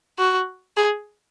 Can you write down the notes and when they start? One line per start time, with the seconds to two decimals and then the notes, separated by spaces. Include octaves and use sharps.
0.18 F#4
0.77 G#4